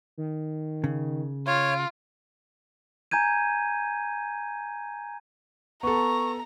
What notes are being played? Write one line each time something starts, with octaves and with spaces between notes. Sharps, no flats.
D#3
C#3
F4 C#5 D7
G#5 A#5 G6 G#6 D#7
B3 A4 A#5 C#6